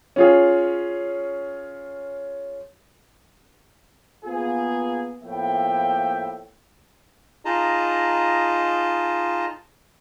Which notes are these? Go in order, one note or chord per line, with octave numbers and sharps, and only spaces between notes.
C#4 F4 G#4
A#3 B3 F4 G#4
A2 F3 A#3 B3 E5 G5
D#4 F4 G#4 D#5 A5 A#5